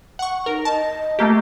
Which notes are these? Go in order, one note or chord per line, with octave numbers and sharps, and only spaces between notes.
F#5 C#6
D#4 A#4
D#5 A5
A3 A#3 G4